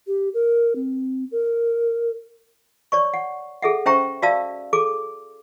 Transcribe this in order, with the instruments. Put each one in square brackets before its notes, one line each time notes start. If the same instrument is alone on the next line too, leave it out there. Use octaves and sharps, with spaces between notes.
[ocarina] G4
A#4
C4
A#4
[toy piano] C#5 D5 C#6
F#5
G#4 A4 E5 F#5
C#4 C5 E5 G5 A#5 C#6
F#4 D5 E5 F5 A5 E6
G#4 A4 D6